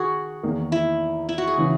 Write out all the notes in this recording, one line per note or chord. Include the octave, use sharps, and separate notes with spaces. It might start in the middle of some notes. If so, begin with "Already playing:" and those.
Already playing: D#3 F#4 G#4
E2 D#3 A#3
E4
E4
F#4
G#4
C#3 E3